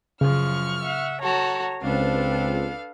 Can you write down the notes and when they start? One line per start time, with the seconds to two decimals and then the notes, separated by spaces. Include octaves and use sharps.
0.21 F#2 C#3 F3 C#6 F6
0.83 E5 F#5
1.23 F#4 A4 C#5 A#5
1.83 C#2 C4 D4 A4 B4 F5